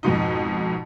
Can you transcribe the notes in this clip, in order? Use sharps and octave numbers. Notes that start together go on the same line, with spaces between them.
F2 G#2 B2 D#4